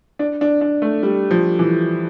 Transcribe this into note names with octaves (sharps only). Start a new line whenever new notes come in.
D4
D4
D4
A3
G3
F3
E3